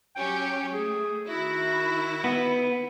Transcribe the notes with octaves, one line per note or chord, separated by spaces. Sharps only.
F#3 C#4 G4 G5
A3 G#4
D#3 E4 F#4
B3